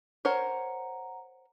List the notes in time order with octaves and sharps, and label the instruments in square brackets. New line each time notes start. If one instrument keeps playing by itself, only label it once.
[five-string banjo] A#4 C5 C#5 [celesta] F#5 A#5